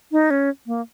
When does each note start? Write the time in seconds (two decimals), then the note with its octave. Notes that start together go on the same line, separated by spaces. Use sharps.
0.12 D#4
0.30 C#4
0.67 A#3